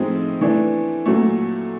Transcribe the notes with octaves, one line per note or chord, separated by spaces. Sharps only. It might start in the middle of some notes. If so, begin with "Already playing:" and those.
Already playing: A2 F3 G#3 C4 D#4
E3 A3 D4
A#2 F#3 A3